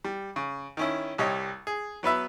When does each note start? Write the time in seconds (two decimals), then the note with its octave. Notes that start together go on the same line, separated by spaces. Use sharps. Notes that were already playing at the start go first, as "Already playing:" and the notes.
0.04 G3
0.36 C#3
0.77 D#3 C#4 E4
1.18 C2 G3 C#5 D#5
1.67 G#4
2.03 F#3 B3 B4 E5